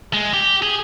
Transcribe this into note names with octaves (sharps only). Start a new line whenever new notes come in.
G#3
G4
G#4